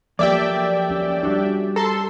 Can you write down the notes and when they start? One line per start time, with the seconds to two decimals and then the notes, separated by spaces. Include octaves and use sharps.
0.19 F3 F#3 A#3 G4 A4 D5 E5 G5
0.89 C#4 G4
1.23 G3 D4 F#4 G4
1.76 A4 A#5 C6